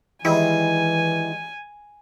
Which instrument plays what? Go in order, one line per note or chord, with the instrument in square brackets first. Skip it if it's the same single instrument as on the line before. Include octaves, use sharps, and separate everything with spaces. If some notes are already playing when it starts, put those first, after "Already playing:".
[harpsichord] D#3 G3 G#3 [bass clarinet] E3 [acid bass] E4 [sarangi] G#5